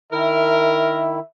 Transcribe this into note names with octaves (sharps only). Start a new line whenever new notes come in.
D#3 E4 A#4 E5